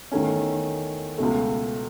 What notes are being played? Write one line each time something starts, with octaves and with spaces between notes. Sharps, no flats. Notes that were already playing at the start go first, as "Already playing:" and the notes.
E2 D#3 A3 C#4
C#2 B2 A3